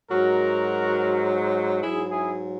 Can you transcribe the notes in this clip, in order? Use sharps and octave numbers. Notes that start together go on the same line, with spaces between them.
G#2 F#3 F#4 A#4
G#2 F#3 E4 G#4
E4 G#4